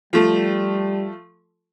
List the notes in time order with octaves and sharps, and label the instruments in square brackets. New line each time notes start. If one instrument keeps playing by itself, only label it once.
[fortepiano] F3 A3 [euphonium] G3